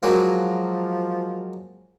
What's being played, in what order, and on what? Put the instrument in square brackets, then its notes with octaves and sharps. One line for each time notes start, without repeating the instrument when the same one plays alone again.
[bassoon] F3 [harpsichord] F#3 G#3 A#3